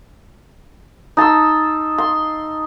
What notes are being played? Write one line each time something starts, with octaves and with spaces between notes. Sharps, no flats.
D#4 A5 C6 E6
C6